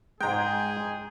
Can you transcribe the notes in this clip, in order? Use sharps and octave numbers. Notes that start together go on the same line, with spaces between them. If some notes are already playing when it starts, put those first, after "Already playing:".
G#2 G#3 G#4 G5 A#5 G6